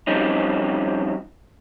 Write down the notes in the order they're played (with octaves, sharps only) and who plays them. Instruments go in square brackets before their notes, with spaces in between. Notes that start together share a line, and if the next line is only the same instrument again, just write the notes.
[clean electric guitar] F3 G3 C4 C#4 D#4